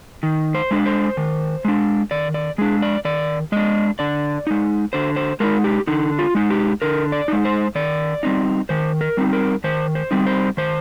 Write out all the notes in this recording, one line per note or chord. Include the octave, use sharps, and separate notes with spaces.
D#3
C5
G#3 D4
C5
D#3
G#3 D4
D#3 D5
D5
G#3 D4 G#4
D5
D#3 D5
G#3 D4 D#5
D3 D5
G#3 D#4
D3 C5
C5
G#3 D#4 A#4
G4
D3 D#4
F4
G#3 D#4
G4
D3 A#4
D5
G#3 D#4
C5
D#3 D5
G3 C4 D#4
D#3 C5
A#4
G3 C4 D#4
A#4
D#3 C5
C5
G3 C4 D#4
C5
D#3 C5